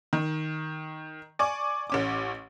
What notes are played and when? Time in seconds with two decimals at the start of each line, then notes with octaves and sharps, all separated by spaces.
0.13 D#3
1.39 D5 G#5 C#6 D6
1.90 A1 C#4 D6